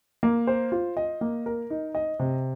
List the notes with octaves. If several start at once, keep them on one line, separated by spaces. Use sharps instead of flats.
A#3
C5
F4
D#5
A#3
A#4
D#4
D#5
C3